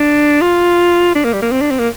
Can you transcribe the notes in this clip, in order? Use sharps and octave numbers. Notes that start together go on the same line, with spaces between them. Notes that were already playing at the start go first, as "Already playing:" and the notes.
Already playing: D4
F4
D4
A#3
G3
A#3
C4
D4
C4
A#3